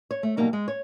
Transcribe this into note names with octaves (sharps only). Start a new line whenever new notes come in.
C#5
A3
B2 F#3 G3 A#3 D#4
G#3
C#5